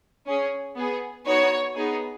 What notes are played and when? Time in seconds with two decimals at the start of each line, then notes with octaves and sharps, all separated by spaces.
0.27 C#4 G#4
0.77 B3 G#4
1.26 B3 D#4 F#4 C#5
1.76 B3 D#4 G#4